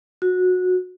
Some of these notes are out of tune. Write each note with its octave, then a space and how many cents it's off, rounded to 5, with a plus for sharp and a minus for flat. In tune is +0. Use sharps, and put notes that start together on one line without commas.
F#4 -20